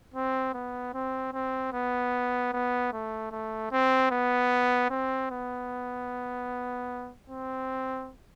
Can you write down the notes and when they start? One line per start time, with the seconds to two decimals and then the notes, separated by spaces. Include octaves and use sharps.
0.14 C4
0.54 B3
0.94 C4
1.33 C4
1.73 B3
2.53 B3
2.93 A3
3.31 A3
3.71 C4
4.11 B3
4.90 C4
5.31 B3
7.30 C4